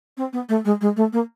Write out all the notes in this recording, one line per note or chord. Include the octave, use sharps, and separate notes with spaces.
C4
B3
A3
G#3
G#3
A3
A#3